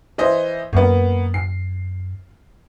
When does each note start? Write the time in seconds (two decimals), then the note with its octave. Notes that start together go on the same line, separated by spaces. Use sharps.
0.18 E3 C5 D#5
0.73 F#2 A#3 B3
1.34 C7